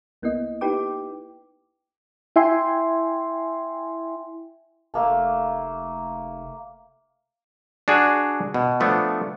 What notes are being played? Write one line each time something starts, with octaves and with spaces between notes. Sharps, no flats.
C2 A#3 B3 E4 D#5
D#4 E4 G4 B4 G5 D6
E4 E5 G5 G#5 C6
F1 A3 A#3 A5
D4 F#4 G#4
B2
F3 A3 B3 D4